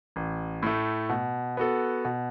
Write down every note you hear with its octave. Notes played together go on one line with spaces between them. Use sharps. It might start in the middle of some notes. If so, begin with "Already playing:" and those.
A1
A2 A3
B2
B3 F#4 A4
B2